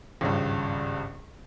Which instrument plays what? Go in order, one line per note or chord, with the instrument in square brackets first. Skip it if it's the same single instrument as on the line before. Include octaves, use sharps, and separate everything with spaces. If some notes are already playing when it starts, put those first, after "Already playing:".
[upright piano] G#1 C#2 G2